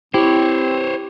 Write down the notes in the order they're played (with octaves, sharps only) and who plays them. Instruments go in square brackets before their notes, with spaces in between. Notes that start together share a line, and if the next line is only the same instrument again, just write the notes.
[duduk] C4 [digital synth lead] E4 [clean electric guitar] G4 [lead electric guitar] C5 C#5